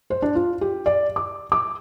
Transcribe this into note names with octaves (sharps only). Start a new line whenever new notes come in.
C5
D4
F4
G4
D5
D6
D6